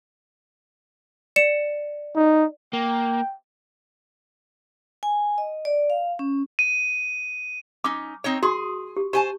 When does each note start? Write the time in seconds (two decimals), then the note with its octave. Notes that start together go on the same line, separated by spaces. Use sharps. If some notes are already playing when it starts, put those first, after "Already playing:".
1.36 D5 C#7 E7
2.16 D#4
2.73 A#3 G5
5.03 G#5
5.38 D#5
5.65 D5
5.90 F5
6.19 C#4
6.59 D#7
7.84 C#4 D#4 D6
8.24 C4 D#4 C#5
8.43 F#4 G#4 C6 C#6
8.97 G4
9.13 G4 C5 G#5 A5 C#6